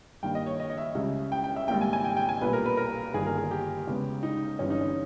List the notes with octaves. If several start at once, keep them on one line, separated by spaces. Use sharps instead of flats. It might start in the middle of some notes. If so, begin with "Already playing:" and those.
G2 D#3 A#3 G5
D#5
C#5
D#5
D#5
E5
C#2 C#3 G3
G5
G5
E5
G#1 G#2 G3 A#3 G5
G#5
G#5
G5
G5
G#5
B1 A#2 G3 B3 B4
A#4
B4
A#4
G1 G2 D#3 A#3 G#4
A#4
G#4
G4
E2 C#3 G#3 B3
D#4
G1 G2 E3 C#4
D#4
C#4